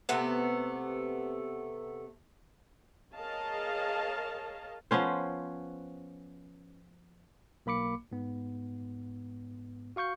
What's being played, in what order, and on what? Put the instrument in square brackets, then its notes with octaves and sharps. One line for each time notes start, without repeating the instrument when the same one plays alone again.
[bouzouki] C3 A3 B3
[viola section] G#4 A#4 C#5 D#5 F5 A5
[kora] F3 B3 C#4 C5
[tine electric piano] B1 A#3 B5 D6 C#7
G#2 B3
F#4 F5 C#6 G6 C#7